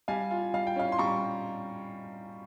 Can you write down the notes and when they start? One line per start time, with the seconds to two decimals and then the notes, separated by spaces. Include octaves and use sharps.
0.08 G3 F5 G#5
0.31 F4
0.54 G3 F5
0.67 G5
0.76 C#4 F5
0.92 C6
0.98 G3 A#5 C#6